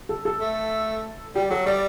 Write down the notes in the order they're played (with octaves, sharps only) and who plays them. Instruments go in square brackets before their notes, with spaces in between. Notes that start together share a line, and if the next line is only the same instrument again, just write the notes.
[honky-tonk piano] A4
A4
[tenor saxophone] A3
[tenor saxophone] G3 [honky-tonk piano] G4
[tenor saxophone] F#3 [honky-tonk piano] A4
[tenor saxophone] G3 [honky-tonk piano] D5